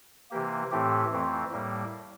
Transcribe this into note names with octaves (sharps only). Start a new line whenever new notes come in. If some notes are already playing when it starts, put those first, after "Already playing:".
C3 E3 A#3 G4
A2 E3 A3 C4 G4
F2 E3 A3 C4
A2 G3 A#3